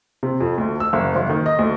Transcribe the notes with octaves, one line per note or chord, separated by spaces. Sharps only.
C3
F2
D2
E6
F#1
F#1
D#3
D#5
D2